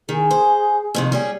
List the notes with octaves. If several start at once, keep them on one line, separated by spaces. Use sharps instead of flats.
D#3 G#4
C5
F2 C3 D#3
G3 C#4 G#4